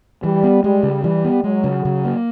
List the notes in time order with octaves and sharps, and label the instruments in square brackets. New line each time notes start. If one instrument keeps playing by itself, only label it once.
[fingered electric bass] E3 [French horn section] G3
[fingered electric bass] B3
[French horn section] G3 [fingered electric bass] G#3
[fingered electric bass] C#3
[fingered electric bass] E3 [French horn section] G3
[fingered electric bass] B3
[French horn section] F#3 [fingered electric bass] G#3
[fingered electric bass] C#3
C#3
A#3